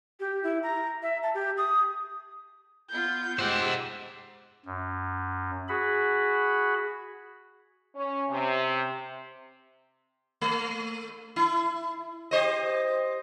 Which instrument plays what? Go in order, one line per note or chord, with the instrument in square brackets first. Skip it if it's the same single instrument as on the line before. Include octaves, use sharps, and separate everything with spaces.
[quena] G4
E4
A#5
E5
A5
G4
D#6
[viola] B3 F4 [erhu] G6
[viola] G#3 G4 [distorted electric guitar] C5 F#5 [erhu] E6
[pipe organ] F#2
F#4 G#4 B5
[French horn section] C#4
C3
[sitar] A3
E4
G4 C5 D#5